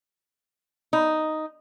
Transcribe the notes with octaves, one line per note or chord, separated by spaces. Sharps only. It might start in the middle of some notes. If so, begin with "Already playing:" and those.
D#4